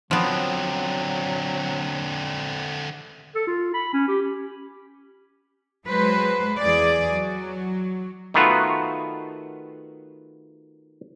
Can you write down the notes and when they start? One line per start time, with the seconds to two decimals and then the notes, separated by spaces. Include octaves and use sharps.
0.11 D3 F3 F#3 B3 C4
3.35 A4
3.47 F4
3.74 B5
3.93 C#4
4.08 G4
5.87 F#3 G#3 B4 C5
6.59 E2 G#4 D5
7.10 F#3
8.34 D#3 A3 B3 F4 F#4 B4